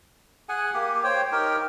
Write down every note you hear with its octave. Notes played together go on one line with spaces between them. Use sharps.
G#4 F#5 G#5
A#3 G4
C5 C#5 G5
D#4 G4 A#4 G5